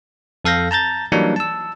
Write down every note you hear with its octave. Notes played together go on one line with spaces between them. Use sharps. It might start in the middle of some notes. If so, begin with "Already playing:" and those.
F2 A4 F5 G6 A#6
A5 A#5 G6 A6
E3 F#3 G3 A#3 D4 D#4
A5 E6